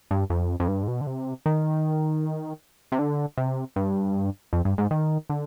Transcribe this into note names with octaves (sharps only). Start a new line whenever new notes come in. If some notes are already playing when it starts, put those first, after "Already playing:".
G2
F2
F2
G2
G#2
B2
D3
C3
D#3
C3
D3
C3
G2
F2
G2
G#2
D#3
D3